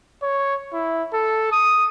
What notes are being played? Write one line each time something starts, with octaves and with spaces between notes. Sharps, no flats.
C#5
E4
A4
D#6